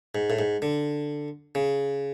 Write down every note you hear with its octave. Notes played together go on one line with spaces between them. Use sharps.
G#2
A2
G#2
D3
C#3